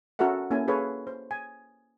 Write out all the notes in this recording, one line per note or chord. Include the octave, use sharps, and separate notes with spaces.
C#4 F#4 A4 A#4 E5 F#5
A#3 C#4 E4 A4 G#5
G#4 A4 B4 C#5 F5 G#5
C5
G#5